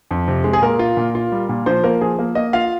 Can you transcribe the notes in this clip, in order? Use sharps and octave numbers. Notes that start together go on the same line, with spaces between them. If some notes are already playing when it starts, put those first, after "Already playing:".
F2
C3
G#3
G#4
A#2 A#4
F4
A#2
F4
G3
A#2
F3 C5
A#3 A#4
F3 G#4
A#3
A#3 D#5
F4 F5